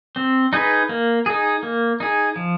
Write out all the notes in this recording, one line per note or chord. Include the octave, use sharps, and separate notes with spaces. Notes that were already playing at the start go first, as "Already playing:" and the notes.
C4
D#4 G#4 B4
A#3
D#4 G#4
A#3
D#4 G#4
F3